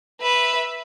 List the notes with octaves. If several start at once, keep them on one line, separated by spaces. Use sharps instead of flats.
B4 E5